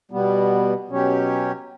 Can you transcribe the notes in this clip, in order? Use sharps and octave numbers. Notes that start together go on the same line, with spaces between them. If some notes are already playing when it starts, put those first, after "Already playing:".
B2 G3 B3
B2 F#3 C#4 G4 C#5